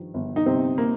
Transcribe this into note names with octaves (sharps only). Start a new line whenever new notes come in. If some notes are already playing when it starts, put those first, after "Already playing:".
Already playing: G2 D#3 F3
G1
D#4
G1 C3 C4
A#3